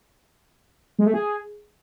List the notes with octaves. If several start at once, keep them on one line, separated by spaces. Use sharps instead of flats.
G#3
A3
G#4